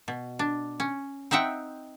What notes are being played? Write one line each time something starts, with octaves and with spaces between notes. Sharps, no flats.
B2
D4
C#4
C4 D#4 E5 F#5 G5